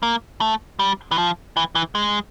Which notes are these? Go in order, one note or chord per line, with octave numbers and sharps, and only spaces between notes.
A#3
A3
G3
E3
F3
E3
E3
G#3